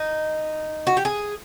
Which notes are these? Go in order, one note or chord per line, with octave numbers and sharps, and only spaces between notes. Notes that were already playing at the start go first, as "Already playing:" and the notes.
Already playing: D#4
F#4
G4
G#4